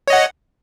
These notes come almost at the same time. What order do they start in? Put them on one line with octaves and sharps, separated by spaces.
C#5 D#5 F#5